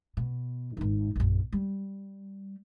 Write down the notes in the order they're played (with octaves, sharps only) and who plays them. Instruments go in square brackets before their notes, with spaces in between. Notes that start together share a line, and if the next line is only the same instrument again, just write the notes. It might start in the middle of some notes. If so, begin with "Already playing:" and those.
[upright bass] B2
G#1 D#4
A#1 F#2
G3